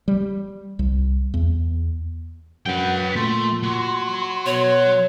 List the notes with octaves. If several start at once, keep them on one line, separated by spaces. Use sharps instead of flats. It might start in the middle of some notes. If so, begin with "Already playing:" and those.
G3
C2
E2
F#2 B4 F#5 G5
A#2 A3 C6
F#3
B2 C#5